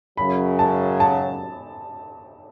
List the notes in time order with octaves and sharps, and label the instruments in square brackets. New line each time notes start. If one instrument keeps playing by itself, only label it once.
[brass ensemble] F#2 C#3 F#3 [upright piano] B5
[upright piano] A5
A5